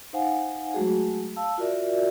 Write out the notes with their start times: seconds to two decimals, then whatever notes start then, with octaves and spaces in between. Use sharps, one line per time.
0.13 D#4 C5 F5 F#5 G#5
0.74 F#3 G#3 A3 F#4 G#4
1.36 F5 A5 E6
1.58 F4 F#4 A#4 D5 E5